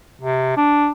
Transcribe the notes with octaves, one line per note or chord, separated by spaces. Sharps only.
C3
D4